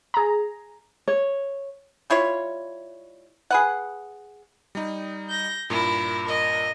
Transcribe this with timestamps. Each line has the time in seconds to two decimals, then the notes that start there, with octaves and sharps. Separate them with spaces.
0.14 G#4 A#5
1.08 C#5
2.10 G3 E4 F4 C#5
3.51 G#4 B4 F#5
4.75 G3 D#4
5.30 G6 A#6
5.70 G2 A#2 E4 A#4
6.25 A#4 D#5